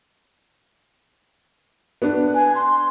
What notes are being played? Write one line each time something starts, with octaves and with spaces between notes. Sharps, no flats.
B3 D4
G#5
C6